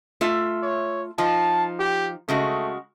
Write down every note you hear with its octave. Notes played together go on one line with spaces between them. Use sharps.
A3 F4 E5
C#5
F3 D#4 F4 A5
G4
C#3 G#3 A3 F#4